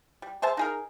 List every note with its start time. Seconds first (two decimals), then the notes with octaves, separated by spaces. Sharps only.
0.22 G3
0.42 G#4 C5 E5 A5
0.57 D#4 G#4 A#4